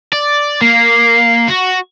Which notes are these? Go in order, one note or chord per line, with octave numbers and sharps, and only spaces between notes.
D5
A#3 C7
F#4